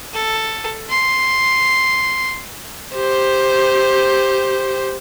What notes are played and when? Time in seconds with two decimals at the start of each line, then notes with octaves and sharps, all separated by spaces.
0.13 A4
0.89 C6
2.95 G4 C5